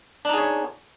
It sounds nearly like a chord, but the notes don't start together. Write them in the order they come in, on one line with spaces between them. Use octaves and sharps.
D4 D#4 G#4 C#5